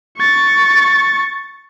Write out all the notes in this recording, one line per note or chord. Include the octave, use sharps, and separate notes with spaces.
C#6 A6